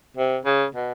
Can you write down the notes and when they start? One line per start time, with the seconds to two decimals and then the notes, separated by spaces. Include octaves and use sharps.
0.17 C3
0.45 C#3
0.75 B2